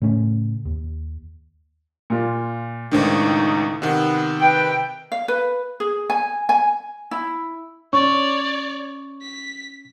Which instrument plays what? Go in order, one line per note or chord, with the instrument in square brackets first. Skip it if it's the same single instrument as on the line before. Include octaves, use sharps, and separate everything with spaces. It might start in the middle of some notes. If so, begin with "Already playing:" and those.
[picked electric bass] A2 C#3 A3 C#4
D#2
[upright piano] A#2 F4
[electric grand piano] C#2 A2 D#3 [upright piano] D4 C5 [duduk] D#4
[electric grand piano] C3 D#3 [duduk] B3 [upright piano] F#5
[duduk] B4 [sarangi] G5
[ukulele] F5
B4
G#4
G#5
G#5
E4
[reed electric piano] C#4 [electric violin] C#5 D5 [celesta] C#6
[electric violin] B6